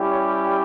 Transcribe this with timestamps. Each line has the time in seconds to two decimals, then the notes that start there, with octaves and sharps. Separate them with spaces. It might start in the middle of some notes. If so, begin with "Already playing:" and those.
Already playing: G3 C#4 E4 G4
0.09 C#5